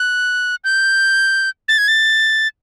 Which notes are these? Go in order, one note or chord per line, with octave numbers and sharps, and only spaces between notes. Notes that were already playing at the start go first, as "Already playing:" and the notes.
Already playing: F#6
G6
A6
G#6
A6